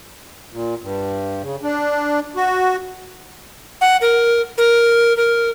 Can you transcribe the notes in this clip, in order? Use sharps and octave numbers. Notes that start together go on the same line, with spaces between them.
A#2
G2
C#3
D4
F#4
F#5
A#4
A#4
A#4